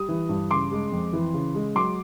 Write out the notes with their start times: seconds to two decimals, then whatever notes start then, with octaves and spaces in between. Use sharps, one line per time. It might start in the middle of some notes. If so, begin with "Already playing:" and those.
Already playing: G3 D#6
0.09 E3
0.29 G2
0.51 C#3 C6 D6
0.72 G#3
0.92 F2
1.13 E3
1.34 C#3
1.54 G#3
1.75 F#3 C6 D6